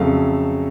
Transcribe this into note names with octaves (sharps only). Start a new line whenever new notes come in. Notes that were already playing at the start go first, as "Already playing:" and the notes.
Already playing: F2 C#3 F#3 A3 F5